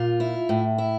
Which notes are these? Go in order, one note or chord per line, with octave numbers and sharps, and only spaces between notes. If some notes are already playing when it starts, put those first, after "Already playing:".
Already playing: A#2 F4
E4
A2
E4